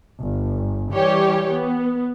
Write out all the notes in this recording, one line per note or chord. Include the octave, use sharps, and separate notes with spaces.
G1
E3 G3 G4 C#5
B3